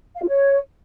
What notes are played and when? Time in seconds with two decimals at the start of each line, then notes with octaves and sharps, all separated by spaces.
0.15 F5
0.22 F4
0.28 C#5